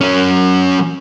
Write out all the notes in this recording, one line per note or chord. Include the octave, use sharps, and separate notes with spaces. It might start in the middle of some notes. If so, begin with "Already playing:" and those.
F#3 C#4